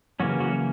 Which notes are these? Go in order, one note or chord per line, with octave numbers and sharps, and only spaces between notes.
C#3 E3 F#3 A#3 C#4 F#4
F#3 F#4